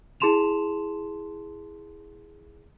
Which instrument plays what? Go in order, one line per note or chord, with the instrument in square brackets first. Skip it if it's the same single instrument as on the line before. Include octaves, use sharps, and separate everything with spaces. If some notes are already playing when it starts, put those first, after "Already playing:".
[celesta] E4 G#4 A5 C6 E7 F7